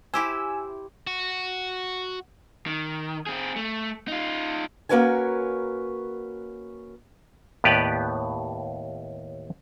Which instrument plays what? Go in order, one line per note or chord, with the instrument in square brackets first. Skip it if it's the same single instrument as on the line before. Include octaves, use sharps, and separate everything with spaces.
[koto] E4 G4 C5 [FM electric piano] G#5 E6
[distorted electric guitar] F#4
[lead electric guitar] D#3
C4 G#4
A3
D#4 F4
[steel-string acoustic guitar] A#3 C#4 F#4 A#4 B4 G#5
[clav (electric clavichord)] D#2 A2 B3 G4 B4 D5